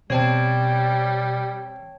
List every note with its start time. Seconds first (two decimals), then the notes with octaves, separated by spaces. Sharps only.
0.10 B2 G3 C4 C#5 G5 A5